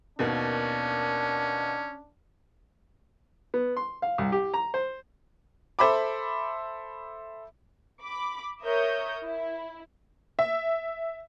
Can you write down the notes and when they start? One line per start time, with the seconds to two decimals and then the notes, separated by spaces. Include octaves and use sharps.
0.19 D#2 B2 A#3 C#4 D4
3.54 B3
3.77 C6
4.02 F5
4.18 C2
4.32 G4
4.54 A#5
4.74 C5
5.79 A4 C5 E5 B5 D6
8.03 B5 D6
8.63 A#4 C#5 E5 D#6 G6
9.23 E4
10.39 E5